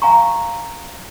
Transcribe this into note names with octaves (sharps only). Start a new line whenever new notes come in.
F5 G#5 A#5 C#6